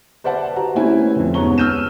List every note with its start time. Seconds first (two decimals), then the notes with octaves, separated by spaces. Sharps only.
0.24 B4 C5 D5 E5 F#5 A5
0.56 F#4 A#5
0.75 A3 C4 C#4 E4 B4 G#5
1.15 F1 F2
1.34 G#2 B3 C#4 A#5 C#6 G7
1.58 E6 F6 G6 D#7 E7